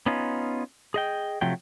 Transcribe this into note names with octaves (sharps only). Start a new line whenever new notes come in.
B3 C#4 D#4 F4
G#4 D#5 G5
C3 F3 F#3 A3 G5